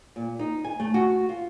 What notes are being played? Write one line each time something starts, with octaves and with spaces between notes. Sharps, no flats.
A#2
D#4
G#5
A3
F#4
F4